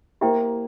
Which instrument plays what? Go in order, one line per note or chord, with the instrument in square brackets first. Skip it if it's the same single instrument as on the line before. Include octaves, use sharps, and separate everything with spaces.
[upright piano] A#3 [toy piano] E4 G4 C5 E5 G5